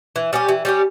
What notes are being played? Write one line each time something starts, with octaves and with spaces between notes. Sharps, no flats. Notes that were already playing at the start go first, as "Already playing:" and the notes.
E3
G3 C#4 G4
E3
G3 C#4 G4